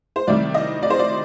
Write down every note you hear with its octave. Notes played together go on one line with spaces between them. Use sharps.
C5
C2 C3 D#3 G3 D5
D#5
D5
C5
D5